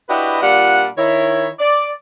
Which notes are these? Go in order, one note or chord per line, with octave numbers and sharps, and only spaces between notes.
D4 E4 F#4 G4 B4 D#5
A#2 G3 D4 F4 F#5
D#3 E4 C#5
D5